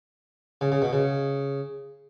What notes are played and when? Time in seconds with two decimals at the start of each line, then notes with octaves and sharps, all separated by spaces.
0.61 C#3
0.72 C#3
0.82 B2
0.93 C#3